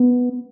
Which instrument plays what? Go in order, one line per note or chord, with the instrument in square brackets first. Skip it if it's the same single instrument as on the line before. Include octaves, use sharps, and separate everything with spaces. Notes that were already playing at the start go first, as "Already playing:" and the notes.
Already playing: [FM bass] B3